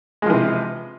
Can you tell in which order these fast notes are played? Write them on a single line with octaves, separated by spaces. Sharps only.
G#3 F3 E3 C3